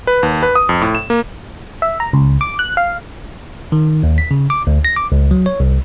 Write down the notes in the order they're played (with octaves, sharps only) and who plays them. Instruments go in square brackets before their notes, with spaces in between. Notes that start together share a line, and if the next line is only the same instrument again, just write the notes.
[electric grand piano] B4
D#2
B4
D#6
F2
A2
E7
A#3
[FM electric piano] E5
A#5
C#2
D6
F#6
F5
[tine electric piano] D#3
D#2
B6
C#3
D6
D2
A#6
D6
C#2
F#3
C#5
C2